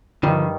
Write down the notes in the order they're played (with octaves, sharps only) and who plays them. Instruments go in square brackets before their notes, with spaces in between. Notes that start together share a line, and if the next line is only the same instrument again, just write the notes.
[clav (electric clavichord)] G2 D#3 G3 [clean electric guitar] D3 F3